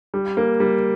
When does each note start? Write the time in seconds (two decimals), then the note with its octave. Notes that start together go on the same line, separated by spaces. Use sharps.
0.14 G3
0.37 A#3
0.60 G3